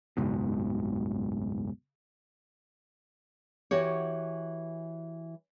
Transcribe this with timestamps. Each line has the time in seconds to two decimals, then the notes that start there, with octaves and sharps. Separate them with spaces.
0.17 F#1 C#2 G#2 B2
3.71 E3 F#4 G4 C#5